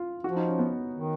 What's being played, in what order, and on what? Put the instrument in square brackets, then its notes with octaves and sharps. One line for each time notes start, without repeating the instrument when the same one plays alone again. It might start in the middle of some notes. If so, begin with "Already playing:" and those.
Already playing: [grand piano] F4
[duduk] F3 [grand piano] F#4
[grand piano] D#4
C#4
B3
[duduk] D#3